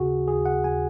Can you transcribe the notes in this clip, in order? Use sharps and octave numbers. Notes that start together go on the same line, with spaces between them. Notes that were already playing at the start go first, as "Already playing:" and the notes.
Already playing: D#2 C#3 F#4 G#4
D#2 G#4
F#5
D#2 G#5